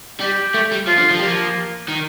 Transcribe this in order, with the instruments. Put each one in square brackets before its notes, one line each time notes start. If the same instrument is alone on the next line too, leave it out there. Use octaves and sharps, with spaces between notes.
[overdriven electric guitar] G3 [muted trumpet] G4
[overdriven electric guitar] A3
G3
[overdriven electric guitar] F3 [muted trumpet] F4
[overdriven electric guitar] D3
F3
[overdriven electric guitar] G3 [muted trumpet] A#3
[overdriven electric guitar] F3
D#3